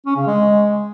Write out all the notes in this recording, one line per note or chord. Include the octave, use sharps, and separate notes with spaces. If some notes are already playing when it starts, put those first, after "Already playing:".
C#4
C#3
G#3